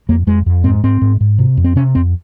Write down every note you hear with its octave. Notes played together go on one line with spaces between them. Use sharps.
F2 A#3
F2 G#3
F2
G#2 C4
G#2 C4
G#2
G#2
C3
F2
C4
C3 C#4
F2 C4